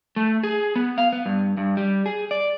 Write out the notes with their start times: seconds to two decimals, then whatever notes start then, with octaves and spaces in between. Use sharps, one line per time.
0.16 A3
0.43 G#4
0.76 B3
0.98 F5
1.13 B3
1.26 G2
1.57 G2
1.77 G3
2.06 G#4
2.31 D5